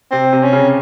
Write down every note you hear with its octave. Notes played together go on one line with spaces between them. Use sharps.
C3 C4
C3
C#4
C#3